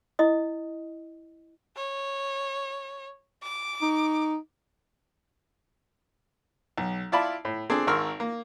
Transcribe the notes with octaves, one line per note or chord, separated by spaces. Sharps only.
E4 D#5 D#6
C#5
D6
D#4
B1
E4 F4 D5 A5 B5
A2
C4 D4 G#4 A4
G#1 A#4 C6 C#6 E6 F6
A#3